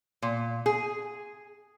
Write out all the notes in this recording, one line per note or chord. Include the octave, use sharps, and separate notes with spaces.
A#2
G#4